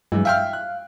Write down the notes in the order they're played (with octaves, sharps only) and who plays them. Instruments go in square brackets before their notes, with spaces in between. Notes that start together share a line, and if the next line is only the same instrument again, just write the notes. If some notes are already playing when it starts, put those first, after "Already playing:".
[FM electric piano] G2 F#3 G#3 [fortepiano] E3
[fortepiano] E5 G5 F6 [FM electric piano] F5
[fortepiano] F#6